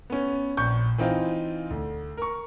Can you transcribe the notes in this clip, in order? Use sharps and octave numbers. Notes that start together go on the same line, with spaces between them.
B3 C#4
A#1 C#6 G6
E3 C4 D#4 F4
D2
A#4 C#6